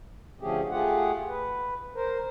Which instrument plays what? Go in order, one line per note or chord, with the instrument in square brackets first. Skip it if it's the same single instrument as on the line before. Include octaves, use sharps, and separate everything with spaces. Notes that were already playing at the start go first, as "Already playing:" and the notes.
[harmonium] D3 F3 A3 C#4 G4 G#4
A3 F4 G4 G#4 F#5
B4
A#4 C5